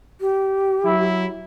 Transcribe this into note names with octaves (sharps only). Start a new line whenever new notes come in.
G4
F#3 E4